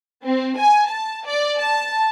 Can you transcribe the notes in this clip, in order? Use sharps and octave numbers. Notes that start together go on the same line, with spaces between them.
C4
G#5
A5
D5
A5